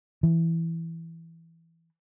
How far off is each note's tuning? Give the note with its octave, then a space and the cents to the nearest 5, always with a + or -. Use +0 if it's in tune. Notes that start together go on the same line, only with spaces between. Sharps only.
E3 +5